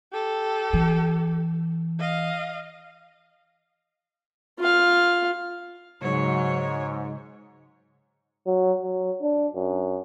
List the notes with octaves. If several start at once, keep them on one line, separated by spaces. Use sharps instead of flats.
G4 A4
E3
D#5 F5
F4 F5
G#2 C#3 F#3 C#5
F#3
F#3
D4
F#2